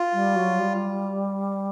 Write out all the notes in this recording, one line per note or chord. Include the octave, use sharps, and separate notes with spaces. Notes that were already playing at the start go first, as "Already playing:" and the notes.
Already playing: F4
G3
F#3
G3